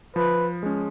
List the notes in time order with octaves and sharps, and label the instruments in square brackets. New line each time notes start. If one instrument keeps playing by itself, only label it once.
[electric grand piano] F3 [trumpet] B4
[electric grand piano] G#3 C#4